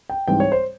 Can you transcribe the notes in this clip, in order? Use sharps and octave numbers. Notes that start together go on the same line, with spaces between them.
G5
G#2 E3 G3 C4 G5
C#5
C5